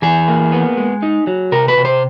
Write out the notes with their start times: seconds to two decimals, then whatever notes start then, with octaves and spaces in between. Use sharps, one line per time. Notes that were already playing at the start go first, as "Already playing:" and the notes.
0.02 E3 G#4
0.28 A#3
0.52 B3
0.77 G#3
1.02 D#4
1.27 F#3
1.52 C3 A#4
1.68 B4
1.77 C3
1.85 C5